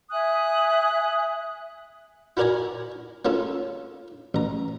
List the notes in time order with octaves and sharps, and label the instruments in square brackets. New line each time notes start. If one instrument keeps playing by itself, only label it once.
[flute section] E5 G#5 D#6 F#6
[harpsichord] E4 F#4 A#4 D5 G#5 A#5
A#3 C#4 F4 A4
A1 A#5